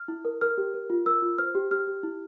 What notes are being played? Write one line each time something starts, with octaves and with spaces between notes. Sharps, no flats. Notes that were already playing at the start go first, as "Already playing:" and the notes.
Already playing: F6
E4
A#4
A#4 F6
G4
A#4
F4
A#4 E6
F4
C5 F6
G4
G4 F6
G4
E4